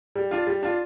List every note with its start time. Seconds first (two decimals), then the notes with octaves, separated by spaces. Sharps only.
0.16 G3
0.31 D4 F4
0.47 G3
0.63 D4 F4